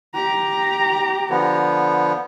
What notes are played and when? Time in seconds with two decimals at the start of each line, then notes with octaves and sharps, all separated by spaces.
0.15 G4 A#5
1.30 D3 F3 B3